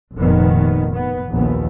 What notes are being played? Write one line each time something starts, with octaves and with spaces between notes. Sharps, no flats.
F1 A#2 D#3 B3
B3
A#1 D#2 B3